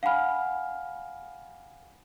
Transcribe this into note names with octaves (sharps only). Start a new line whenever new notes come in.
F5 F#5 G#5 B5 F6